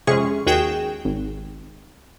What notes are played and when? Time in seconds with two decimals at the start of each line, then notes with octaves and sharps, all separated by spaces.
0.07 F2 C3 G#3 C#4 G#4 C#6
0.46 D#2 F#4 G#4 G5 E7
1.05 G#1